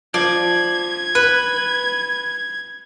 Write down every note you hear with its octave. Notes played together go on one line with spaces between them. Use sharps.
F3 D5 G#6
B4 F#6